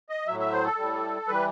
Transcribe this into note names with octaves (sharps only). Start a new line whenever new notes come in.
D#5
A2 F#3 E5
E5
C5
A4
A2 G3
E3 G3 B4